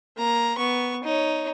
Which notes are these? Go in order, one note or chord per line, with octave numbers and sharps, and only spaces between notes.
A#3 A#5
B3 C#6
D#4 C#5